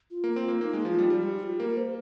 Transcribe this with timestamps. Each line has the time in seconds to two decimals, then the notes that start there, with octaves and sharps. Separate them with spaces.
0.11 F4
0.24 A#3
0.36 C4
0.48 A#3
0.61 A#3 D#4
0.73 G#3
0.85 F3 F4
0.99 G3
1.10 G3 G4
1.39 G4
1.43 F4
1.59 A#3 A#4
1.77 C5